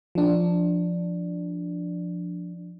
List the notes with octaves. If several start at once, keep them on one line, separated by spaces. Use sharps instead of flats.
F3 D4